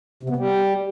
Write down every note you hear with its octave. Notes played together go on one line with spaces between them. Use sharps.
C3
B3
G3